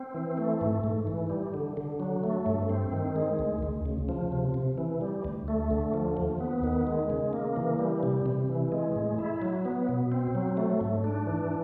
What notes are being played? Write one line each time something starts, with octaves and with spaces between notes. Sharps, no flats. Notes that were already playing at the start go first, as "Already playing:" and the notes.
Already playing: C4
E3
A3
G#2
G#2
E3
G3
D3
D3
F#3
A3
G2
C4
D#3
G#3
D2
D2
C#3
F3
C3
C3
E3
G3
D2
A3
D3
F3
D#2
B3
D#3
G#3
C#3
A#3
E3
G3
C3
C3
E3
G#3
A2
E4
F#3
B3
B2
C4
F#3
A3
G#2
D4
E3